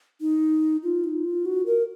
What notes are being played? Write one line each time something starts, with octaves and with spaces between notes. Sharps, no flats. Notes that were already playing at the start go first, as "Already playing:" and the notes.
D#4
F4
D#4
F4
F#4
A#4